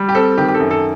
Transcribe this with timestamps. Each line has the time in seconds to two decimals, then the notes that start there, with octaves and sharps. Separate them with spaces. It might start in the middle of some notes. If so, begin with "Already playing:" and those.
Already playing: G3
0.09 G4
0.15 C4 A4
0.37 D#3 G4
0.48 G4
0.54 A4
0.60 F#2
0.71 A4